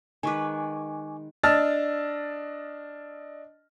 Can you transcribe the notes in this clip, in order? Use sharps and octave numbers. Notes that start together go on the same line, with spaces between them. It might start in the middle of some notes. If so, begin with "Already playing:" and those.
D#3 G#3 B4 G#5 C#6 D6
D4 D#5 A5 E6 F6 A6